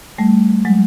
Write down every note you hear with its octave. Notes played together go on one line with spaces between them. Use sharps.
G3 A3
F#3 G#3